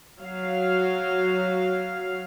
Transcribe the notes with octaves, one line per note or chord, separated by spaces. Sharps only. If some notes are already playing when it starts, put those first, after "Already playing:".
F#3 F5